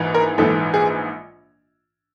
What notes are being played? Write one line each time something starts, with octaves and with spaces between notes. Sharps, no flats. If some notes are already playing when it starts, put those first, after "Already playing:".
Already playing: A#1 G#2 E3
A#4
A#1 G#2 E3 A4
G#4